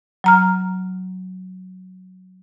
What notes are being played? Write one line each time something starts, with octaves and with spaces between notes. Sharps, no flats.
F#3 A#5 F6